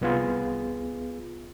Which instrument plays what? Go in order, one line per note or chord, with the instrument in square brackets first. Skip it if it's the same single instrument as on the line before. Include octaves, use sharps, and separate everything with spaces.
[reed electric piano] C2 B3 F4 G#4